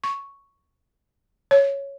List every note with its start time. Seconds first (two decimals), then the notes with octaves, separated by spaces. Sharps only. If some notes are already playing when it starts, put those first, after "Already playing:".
0.04 C#6
1.51 C#5